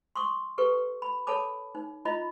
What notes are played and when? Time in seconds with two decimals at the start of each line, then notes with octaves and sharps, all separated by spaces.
0.15 C6 C#6 D#6
0.58 G4 A4 B4 C#6
1.02 B5
1.27 A4 C#5 A5 B5 D6
1.75 D#4
2.05 E4 F4 D#5 B5